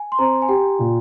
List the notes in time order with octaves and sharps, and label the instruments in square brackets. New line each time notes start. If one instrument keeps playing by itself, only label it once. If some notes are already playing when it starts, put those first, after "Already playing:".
Already playing: [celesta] G#5
C6
[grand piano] C4 [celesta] A#5
[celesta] G#5
[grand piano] G4 [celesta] G5
[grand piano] A#2